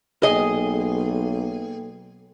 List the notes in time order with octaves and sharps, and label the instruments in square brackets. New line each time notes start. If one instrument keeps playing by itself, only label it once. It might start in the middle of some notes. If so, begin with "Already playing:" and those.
[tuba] B1 [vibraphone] A#3 A4 G5 [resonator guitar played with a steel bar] G#4 [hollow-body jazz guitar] D#5